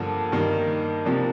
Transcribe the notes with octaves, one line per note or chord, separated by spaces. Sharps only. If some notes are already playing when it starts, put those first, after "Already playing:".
Already playing: G2 D3 F3 A#3
G2 D#3 A#3
C3 F3 A#3 D4